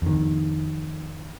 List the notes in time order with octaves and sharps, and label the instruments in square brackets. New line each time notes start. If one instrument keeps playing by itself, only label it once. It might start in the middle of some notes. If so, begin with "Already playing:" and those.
[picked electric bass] F2 D#3